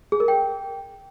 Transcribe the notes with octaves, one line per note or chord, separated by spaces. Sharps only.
G#4
A#4
G5